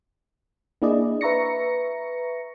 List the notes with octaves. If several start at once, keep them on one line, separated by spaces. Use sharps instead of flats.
A#3 D4 E4 G#4 D5 D#5
B4 E5 A#5 C#6 A#6 C#7